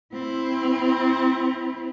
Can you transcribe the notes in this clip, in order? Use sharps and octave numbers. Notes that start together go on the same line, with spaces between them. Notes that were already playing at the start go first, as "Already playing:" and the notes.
C4 E4